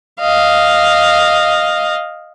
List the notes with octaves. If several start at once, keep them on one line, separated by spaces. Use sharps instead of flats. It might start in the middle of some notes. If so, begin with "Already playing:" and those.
D#5 F5